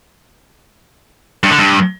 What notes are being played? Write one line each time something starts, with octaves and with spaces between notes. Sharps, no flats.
G2
D3
G2